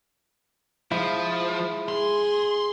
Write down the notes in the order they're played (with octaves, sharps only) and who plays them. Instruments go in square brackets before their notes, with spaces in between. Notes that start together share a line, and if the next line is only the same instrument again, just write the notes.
[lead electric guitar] F3 [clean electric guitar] G#3 E4
[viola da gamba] G#4 [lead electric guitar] C6